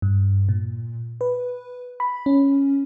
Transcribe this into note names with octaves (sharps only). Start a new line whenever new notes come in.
G2
A#2
B4
B5
C#4